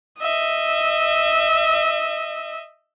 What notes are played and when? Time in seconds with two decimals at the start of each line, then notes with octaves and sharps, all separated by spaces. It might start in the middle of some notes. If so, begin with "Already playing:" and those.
0.19 D#5 E5